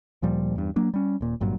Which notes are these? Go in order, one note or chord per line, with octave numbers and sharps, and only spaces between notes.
D2 A#2 F3 G3
E2 G2
F#3 A#3 D4
G3 C#4
D#1 A#2
G#1 G2 A#2 F#3